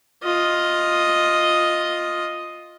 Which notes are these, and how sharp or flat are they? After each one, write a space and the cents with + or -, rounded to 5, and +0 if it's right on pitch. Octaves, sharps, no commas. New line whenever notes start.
F4 +5 D#5 +0